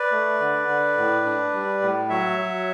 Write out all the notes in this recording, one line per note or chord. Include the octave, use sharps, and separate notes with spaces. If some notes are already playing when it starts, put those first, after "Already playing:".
Already playing: B4 D5
A3
D3
D3
A2
D4
G3
A2
F#3 C#5 E5
F#3